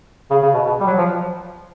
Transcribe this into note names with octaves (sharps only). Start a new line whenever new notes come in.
C#3
C#3
B2
B2
G3
F#3
F3